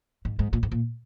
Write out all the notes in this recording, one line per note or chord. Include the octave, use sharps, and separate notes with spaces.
G#2
G#2
A#2
G#2
A#2